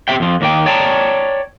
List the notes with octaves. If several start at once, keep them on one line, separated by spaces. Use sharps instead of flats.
C4 G4 G#4 E5 G5
F2 F3
D#2 A#3 G5
C#5 D5 G5 A5 A#5